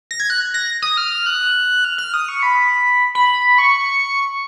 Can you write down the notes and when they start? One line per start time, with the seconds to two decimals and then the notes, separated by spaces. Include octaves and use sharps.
0.11 A#6
0.20 G#6
0.30 F#6
0.54 A#6
0.82 D#6
0.97 F6
1.26 F#6
1.85 F6
1.98 F6
2.14 D#6
2.29 C#6
2.43 B5
3.15 B5
3.58 C#6